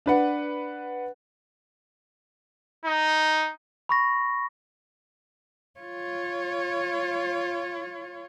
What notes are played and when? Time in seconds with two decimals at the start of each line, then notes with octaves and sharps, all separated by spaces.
0.06 D4 B4 F#5
2.86 D#4
3.89 B5 C#6 A#6
5.80 F4 C#5